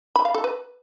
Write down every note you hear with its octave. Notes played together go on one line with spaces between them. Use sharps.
B5
F5
A4
B4